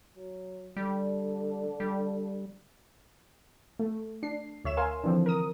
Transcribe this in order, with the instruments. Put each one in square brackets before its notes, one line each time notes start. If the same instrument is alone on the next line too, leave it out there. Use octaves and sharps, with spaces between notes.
[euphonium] F#3
[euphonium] D3 [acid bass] G3
[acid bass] G3
[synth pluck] A3
D4 C7
D2 C#5 E5 E7
A#4 F5 G#5 C6
D3 E3 F3 C4
A#4 D#6